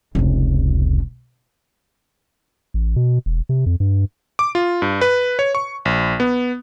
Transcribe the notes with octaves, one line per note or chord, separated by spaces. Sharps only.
F1 C#2
A1
B2
E1
C3
F2
G2
D6
F4
G2
B4
C#5
C#6
A#1
B3